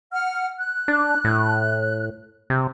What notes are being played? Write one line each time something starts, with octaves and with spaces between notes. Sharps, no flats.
F#5 F6
F#6
D4
A2
C3